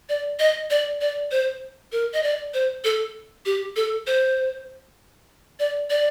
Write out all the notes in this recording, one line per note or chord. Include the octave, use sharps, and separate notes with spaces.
D5
D#5
D5
D5
C5
A#4
D#5
D5
C5
A4
G4
A4
C5
D5
D5